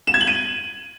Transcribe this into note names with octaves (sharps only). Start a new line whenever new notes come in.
E7
G#6
F#7
D#7